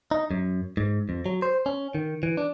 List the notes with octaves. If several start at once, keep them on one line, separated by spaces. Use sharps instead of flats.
D#4
F#2
G#2
F2
F#3
C5
C#4
D#3
E3
D4